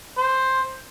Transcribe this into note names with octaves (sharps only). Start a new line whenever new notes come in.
C5